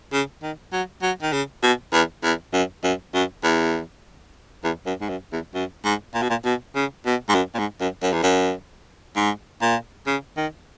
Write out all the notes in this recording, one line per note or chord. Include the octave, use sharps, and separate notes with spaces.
C#3
D#3
F#3
F#3
D#3
C#3
B2
E2
E2
F#2
F#2
F#2
E2
E2
F#2
G#2
F#2
E2
F#2
G#2
A#2
B2
A#2
B2
C#3
B2
G#2
F#2
A#2
G#2
F#2
F#2
E2
F#2
G#2
A#2
C#3
D#3